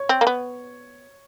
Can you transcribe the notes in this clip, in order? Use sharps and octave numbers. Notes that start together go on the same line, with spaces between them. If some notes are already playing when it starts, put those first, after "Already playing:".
Already playing: C#5
C4
A#3
B3